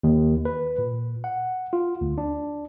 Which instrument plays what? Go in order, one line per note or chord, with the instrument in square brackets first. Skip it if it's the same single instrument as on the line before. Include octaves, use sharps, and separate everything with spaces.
[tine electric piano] D#2
B4
A#2
F#5
F4
D2
D4